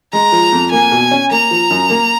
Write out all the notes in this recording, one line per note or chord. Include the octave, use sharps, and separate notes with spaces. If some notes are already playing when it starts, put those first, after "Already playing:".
G#3 A#5
F3
F2
A#3 G#5
B2
C#4
A#3 A#5
F3
F#2
A#3